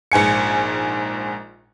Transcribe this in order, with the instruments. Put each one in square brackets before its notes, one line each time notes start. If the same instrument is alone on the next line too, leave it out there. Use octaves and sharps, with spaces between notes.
[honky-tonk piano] A#1 G#2 G#5 C#7